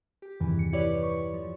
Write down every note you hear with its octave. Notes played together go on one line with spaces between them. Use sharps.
G4
E2 G2 C3 D#3 E3
C#7
E4 G4 B4 C#5 D5
C#6
F3